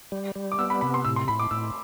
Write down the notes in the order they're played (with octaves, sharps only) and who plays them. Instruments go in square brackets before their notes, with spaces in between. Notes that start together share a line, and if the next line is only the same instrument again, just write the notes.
[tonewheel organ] G3
G3
[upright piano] D6
[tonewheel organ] B3 [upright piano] E6
[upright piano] B5
[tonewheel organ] C3 [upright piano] B5
[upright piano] C6
[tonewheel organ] A2 [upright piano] E6
[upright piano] C6
[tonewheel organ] A2 [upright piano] B5
[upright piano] D6
[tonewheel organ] A2 [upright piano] E6